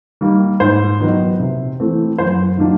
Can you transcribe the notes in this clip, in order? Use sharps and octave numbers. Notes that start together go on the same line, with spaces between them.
D#3 G3 A#3
G#2 C5
D#3 F#3 B3 D#4
C3
E3 A3 C4
F#2 C5
D#3 F#3 A#3 D4